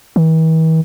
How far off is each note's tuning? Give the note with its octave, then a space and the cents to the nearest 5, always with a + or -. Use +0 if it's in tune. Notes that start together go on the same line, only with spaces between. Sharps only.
E3 -45